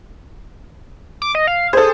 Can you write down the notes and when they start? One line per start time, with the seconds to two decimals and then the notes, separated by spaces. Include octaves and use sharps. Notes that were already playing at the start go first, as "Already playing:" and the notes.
1.22 D6
1.35 D#5
1.47 F5
1.73 G#4 A4 C5